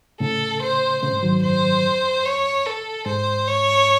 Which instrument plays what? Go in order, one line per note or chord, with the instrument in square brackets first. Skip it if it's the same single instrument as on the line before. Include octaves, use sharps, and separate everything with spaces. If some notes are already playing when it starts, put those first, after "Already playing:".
[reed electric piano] A2 C#3 [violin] A4
[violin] C5
[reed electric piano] A2 C#3 [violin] C5
[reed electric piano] G#2
D#3 F#3
[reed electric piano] F#2 [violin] C5
[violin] C#5
A4
[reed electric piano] G#2 [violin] C5
[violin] C#5